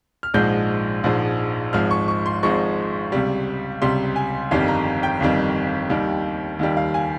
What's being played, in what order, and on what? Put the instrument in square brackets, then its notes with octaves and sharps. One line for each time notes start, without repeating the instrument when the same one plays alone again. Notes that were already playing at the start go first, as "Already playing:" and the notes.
[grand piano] F6
A#1 G#2 F3 G#3 G6
A#1 G#2 F3 G#3
G#1 G#2 F3 G#3 F6
C#6
C#6
C6
G#1 G#2 F3 G#3 C#6
C#2 C3 G3
C#2 C3 G3 C6
G#5
G1 F2 D#3 G3 F5
A#5
G5
G1 F2 D#3 G3
D#2 D#3 G3
D#2 D#3 G3
F5
G#5